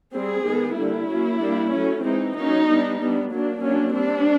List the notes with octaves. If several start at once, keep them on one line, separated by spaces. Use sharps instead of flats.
G3 C4 G#4
D#3 G#3 B3
D3 G3 A#3 E4
F#3 A#3 C#4
G3 A#3 D4
F#3 A3 C#4
E3 G#3 C4 D#4
F#3 A#3 C#4 D#4
G3 B3 D4
G3 B3 D4
F#3 A#3 D4
F#3 A#3 C#4 D4
G3 C4 D4